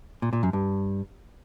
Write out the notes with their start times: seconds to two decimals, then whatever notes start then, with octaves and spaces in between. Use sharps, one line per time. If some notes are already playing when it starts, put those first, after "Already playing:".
0.22 A#2
0.33 A#2
0.43 F#2
0.53 G2